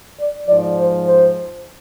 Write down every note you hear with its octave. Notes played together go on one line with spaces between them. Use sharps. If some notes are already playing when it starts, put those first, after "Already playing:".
D5
G#2 F3 D5
C5
C5